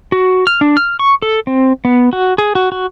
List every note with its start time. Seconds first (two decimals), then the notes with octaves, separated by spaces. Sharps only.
0.12 F#4
0.47 F6
0.61 D4
0.77 F6
0.99 C#6
1.22 A4
1.47 C4
1.85 B3
2.13 F#4
2.38 G#4
2.55 F#4
2.72 F#4